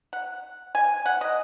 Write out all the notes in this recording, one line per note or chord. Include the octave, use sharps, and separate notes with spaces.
F#5
G#5
F#5
D#5